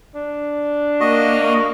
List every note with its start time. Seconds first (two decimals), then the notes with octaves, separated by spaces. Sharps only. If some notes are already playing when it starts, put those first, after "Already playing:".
0.15 D4
1.00 A#3 F#4 D#5